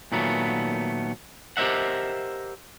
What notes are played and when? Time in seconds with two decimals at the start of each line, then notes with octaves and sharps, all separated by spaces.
0.12 A#2 D#3 F#3 A3 B3
1.57 G4 A#4 C5 D#5 E5 F#5